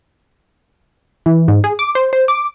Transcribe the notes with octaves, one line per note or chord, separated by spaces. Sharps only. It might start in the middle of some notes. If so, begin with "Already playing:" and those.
E3
G#2
G#4
D6
C5
C5
D6